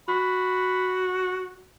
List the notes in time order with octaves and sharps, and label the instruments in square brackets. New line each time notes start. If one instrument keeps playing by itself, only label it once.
[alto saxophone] F#4 [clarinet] B5